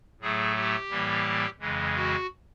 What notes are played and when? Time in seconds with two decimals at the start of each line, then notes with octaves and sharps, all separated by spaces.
0.20 A2 F#3 A3 G#4
0.56 G4
0.90 A2 E3 G3 A#3
1.60 F2 C#3 E3 G#3
1.95 F#4